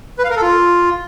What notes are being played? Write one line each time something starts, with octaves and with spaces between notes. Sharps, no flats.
B4
F5
A#4
A4
F4